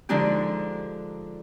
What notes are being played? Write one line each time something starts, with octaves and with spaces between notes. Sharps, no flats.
D3 F3 G#3 D4 D#4 G4